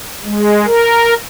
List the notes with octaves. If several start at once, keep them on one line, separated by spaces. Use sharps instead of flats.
G#3
A#4